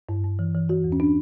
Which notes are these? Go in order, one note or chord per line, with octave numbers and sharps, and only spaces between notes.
G2
G2
E3
E3
E3 F#4
E2
C#4
D4